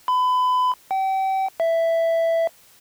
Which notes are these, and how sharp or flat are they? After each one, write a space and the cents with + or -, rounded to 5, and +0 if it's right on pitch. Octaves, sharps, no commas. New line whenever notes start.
B5 +30
G5 -35
E5 +5